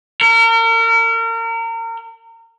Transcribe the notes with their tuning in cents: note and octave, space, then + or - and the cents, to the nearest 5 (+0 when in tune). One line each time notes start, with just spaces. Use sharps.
A#4 -35